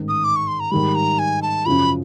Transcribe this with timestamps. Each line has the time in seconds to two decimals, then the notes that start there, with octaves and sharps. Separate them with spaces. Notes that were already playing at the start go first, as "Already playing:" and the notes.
Already playing: A1 G#2 D#3
0.08 D#6
0.24 D6
0.36 C#6
0.48 C6
0.60 A#5
0.71 G#2 D#3 G3 B5
0.95 A#5
1.19 G#5
1.42 A5
1.66 F#2 C#3 F3 B5